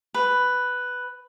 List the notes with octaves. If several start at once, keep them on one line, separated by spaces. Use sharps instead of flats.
B4